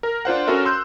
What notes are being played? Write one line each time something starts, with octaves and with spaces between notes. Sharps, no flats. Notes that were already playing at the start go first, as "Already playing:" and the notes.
A#4
D4 F4 C5 F#5
C#4 F#4 A4 A#4 E5
C6 E6 F#6 G6